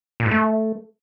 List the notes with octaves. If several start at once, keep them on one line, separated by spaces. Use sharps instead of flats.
A#2
G#2
A3